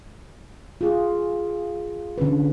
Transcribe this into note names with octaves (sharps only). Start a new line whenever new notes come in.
F4 G#4
D3 C#4 B4